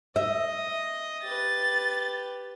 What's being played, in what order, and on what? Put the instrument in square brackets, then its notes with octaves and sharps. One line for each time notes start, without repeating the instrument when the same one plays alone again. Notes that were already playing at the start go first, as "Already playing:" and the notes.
[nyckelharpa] D#5 [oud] E5
[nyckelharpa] G4 B4 [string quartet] A6